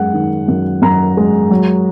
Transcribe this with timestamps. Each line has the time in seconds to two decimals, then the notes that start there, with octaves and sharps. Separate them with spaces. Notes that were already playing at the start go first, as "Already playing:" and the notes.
Already playing: F#2 G#3 F#5
0.14 D#3
0.48 F#2
0.82 F#2 A#5
1.17 G#3
1.51 F#3